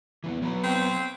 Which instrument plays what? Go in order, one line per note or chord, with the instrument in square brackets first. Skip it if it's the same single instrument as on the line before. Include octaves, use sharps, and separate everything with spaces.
[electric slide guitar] E3 A#3 B3
F#3 B3 B4
[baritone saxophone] C4